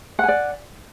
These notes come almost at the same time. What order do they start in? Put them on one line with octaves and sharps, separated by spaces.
F#5 G#5 D5